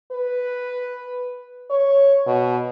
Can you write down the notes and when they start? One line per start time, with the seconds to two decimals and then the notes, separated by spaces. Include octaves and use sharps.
0.12 B4
1.71 C#5
2.27 B2